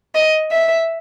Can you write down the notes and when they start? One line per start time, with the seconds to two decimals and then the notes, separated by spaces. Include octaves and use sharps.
0.15 D#5
0.51 E5